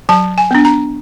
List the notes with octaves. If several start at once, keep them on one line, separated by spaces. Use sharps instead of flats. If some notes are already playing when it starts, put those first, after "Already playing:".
F#3 A5
G#5
B3 D4
A#5